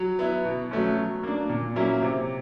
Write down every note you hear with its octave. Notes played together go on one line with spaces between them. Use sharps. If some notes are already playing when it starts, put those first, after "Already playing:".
Already playing: F#3
B3 E4
B2
F#3 A3 C#4
F#3
A#3 D4
A#2
F#3 A#3 C#4 E4
C3